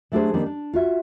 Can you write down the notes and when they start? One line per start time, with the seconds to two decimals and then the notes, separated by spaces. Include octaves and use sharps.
0.12 F#3 A3 D4 G4 G#4 C5
0.33 D#3 G3 A#3 C4 D4
0.46 D4
0.73 F4 F#4 E5